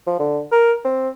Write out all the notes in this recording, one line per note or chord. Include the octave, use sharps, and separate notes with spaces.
F3
D3
A#4
C4